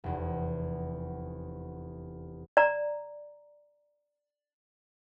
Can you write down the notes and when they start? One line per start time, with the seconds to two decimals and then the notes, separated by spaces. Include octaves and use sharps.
0.04 F1 E2
2.57 D5 A#5